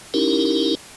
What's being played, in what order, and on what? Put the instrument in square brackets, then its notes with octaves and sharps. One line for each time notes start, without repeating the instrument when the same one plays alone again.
[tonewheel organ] C#4 D#4 E4 G4 A#4